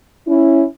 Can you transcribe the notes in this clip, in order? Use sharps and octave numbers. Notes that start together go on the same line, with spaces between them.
C#4 E4